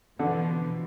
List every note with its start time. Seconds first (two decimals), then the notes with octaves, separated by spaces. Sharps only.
0.19 B2 D3 E3 F3